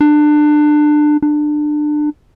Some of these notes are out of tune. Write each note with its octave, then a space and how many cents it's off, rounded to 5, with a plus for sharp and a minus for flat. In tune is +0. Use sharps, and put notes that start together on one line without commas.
D4 +25
D4 +25